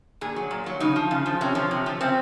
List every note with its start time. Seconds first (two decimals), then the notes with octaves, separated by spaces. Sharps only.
0.21 A#2 G#4
0.36 F#3
0.51 A#2
0.66 F#3
0.80 C#3 D#4
0.96 F3
1.11 C#3
1.26 F3
1.41 C3 C#4
1.55 F3
1.71 C3
1.86 F3
2.01 C#3 C4